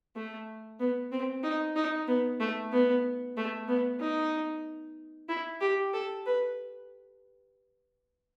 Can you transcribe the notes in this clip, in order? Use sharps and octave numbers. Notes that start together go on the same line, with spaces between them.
A3
B3
C4
D#4
D#4
B3
A3
B3
A3
B3
D#4
E4
G4
A4
B4